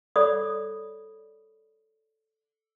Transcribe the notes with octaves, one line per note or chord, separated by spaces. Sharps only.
A4 C#5 D5 B5 D#6